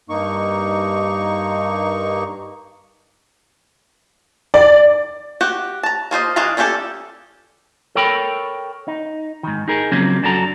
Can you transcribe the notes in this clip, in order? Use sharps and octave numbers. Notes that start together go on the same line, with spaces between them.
G2 A#3 D#4 C#6
D5
F#4 G4 F#5
A5 A#5
A#3 F4 C5 D#5
E3 D4 D#5 F5 A#5
G3 C#4 E4 G4 A4
A4 A#4 C#5 G5 B5
D#4
G#2 D#3
D#4 G#4 A#4
C#3 F3 F#3 A#3 C4 C#4
F#2 D4 F#4 A4 A#5